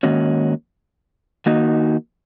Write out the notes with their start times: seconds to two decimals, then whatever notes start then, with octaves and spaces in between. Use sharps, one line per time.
0.03 G#2 D#3 A#3 C#4 F#4
1.46 D#3 A#3 D#4 F#4